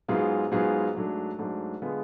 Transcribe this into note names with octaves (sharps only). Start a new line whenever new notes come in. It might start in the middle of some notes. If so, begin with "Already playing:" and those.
G#2 F#3 B3 F4 G#4
G#2 F#3 B3 F4 G#4
G#2 F#3 A3 D4
G#2 F#3 A3 D4
D3 G#3 B3 F4 G#4